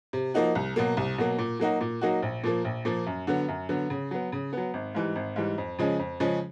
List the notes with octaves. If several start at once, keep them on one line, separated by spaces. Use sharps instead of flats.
C3
F3 A#3 D#4 F#4
C2
B2 F#3 A#3
C2
B2 F#3 A#3
A#2
F#3 A#3 D#4 F#4
A#2
F#3 A#3 D#4 F#4
A#1
A#2 F3 A#3
A#1
A#2 F3 A#3
F#2
D3 F#3 B3
F#2
D3 F#3 B3
C#3
F#3 B3
C#3
F#3 B3
G#1
G#2 E3 G3
G#1
G#2 E3 G3
F2
C#3 F3 G#3 C#4
F2
C#3 F3 G#3 C#4